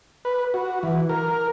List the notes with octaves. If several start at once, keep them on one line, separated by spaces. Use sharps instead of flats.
B4
F#4
E3
A#4